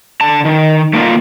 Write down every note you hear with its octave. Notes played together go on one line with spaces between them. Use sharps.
D3 A5
D#3
A3 A#3 D#4 F4